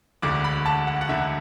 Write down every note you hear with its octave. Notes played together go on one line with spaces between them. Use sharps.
E1 D2 D3 D6
B5
A5
F#5
F#5
E1 D2 D3 E5